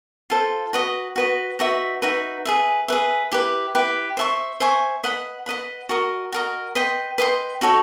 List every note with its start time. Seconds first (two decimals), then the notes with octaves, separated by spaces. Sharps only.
0.30 F4 A4 C5
0.73 F#4 B4 D#5
1.16 F#4 B4 D#5
1.59 D#4 F#4 B4 E5
2.02 D#4 F#4 B4 E5
2.45 G#4 B4 E5
2.88 G#4 B4 E5
3.32 E4 G4 B4
3.75 E4 G4 B4
4.17 C5 E5 G#5 C#6
4.60 C5 E5 G#5 C#6
5.03 B4 D#5 F#5 B5
5.46 B4 D#5 F#5 B5
5.89 F#4 A#4 D#5
6.32 F#4 A#4 D#5
6.75 B4 D#5 G5 C6
7.18 B4 D#5 G5 C6
7.61 D#4 F#4 A4 C#5